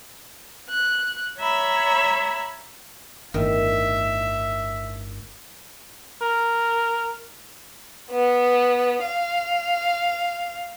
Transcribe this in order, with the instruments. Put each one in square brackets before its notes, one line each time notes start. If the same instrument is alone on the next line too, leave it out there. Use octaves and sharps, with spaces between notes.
[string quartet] F#6
C#5 E5 A#5 B5
[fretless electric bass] G1 A2 [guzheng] D#3 [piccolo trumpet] E5
[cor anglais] A#4
[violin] B3
F5